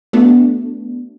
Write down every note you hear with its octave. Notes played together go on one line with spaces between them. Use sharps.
A3 B3 D4 F#4